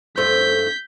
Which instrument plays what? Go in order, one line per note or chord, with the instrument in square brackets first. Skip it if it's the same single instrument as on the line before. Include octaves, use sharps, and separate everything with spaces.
[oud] G2 A3 C5 [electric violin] G6 B6